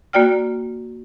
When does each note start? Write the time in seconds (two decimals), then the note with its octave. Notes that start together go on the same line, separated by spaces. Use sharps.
0.13 A#3 F#4 D5 G5 F6